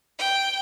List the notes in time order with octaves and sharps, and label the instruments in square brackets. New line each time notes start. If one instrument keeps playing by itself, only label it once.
[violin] G5